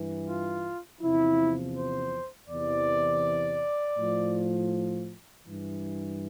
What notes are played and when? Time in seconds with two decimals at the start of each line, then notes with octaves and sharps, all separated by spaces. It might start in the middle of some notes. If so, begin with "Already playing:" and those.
Already playing: G2 E3
0.27 F4
1.01 E2 C3 F3 E4
1.76 C5
2.48 E2 C3 E3 D5
3.97 A2 F3
5.44 G2 E3